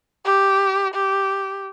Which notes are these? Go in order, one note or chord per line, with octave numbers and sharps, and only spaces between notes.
G4
G4